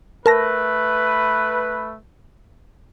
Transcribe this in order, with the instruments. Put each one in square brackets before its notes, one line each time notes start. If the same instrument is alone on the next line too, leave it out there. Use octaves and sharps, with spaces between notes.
[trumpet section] A3 B4 [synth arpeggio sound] A#4 A5 A#6